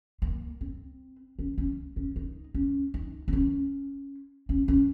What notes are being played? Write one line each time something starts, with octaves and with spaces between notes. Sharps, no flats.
A#3
C4
C#4
C#4
C#4
D#4
C#4
D#4
C4
C#4
C#4
C#4